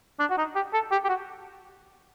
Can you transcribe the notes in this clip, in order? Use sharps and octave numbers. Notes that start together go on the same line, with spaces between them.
D4
F#4
D#4
G4
A4
G4
G4
F#4